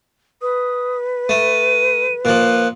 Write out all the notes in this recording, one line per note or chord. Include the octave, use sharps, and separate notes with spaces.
B4 D#6
A3 D#7
A#2 F3 F#6